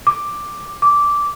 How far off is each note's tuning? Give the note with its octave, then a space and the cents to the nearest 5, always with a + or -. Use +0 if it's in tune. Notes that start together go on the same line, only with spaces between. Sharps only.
D6 +5
D6 -10